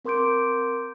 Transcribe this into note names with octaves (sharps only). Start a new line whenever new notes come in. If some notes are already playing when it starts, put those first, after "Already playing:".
C4 A#4 C6 D6 G6 D7